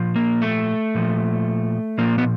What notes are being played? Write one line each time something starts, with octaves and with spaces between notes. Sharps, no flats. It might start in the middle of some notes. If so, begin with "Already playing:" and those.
Already playing: A#2 F3
A#3
A3
A#2 F3
A#2 F3 A#3
B3